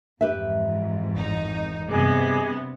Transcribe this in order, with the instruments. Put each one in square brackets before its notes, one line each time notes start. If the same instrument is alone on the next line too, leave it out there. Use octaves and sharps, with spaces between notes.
[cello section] F2 G#2 E3 [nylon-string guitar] G4 B4 E5
[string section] G#1 D#4
[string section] G2 C3 B3 [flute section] G#4 D#5 D6